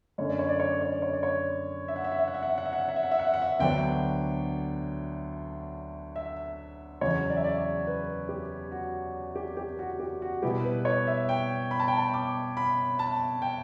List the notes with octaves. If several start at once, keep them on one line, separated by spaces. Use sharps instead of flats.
F#2 D3 A3 C#5
D5
C#5
D5
C#5
D5
C#5
D5
C#5
D5
C#5
E5
F#5
E5
F#5
E5
F#5
E5
F#5
E5
F#5
E5
F#5
E5
F#5
E5
F#5
E5
F#5
E5
F#5
E5
D2 D3 F#3 B3 D4 G5
E5
E2 C#3 F#3 C#5
D5
E5
D5
D5
B4
G4
F#4
G4
G4
F#4
F#4
G4
F#4
B2 G3 B3 E4 G4
B4
C#5
E5
G5
B5
A5
G5
A5
D6
B5
A5
G5